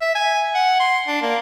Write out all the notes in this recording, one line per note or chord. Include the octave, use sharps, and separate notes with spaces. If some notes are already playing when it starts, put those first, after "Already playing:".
E5
G#5
F#5
C6
D4
A#3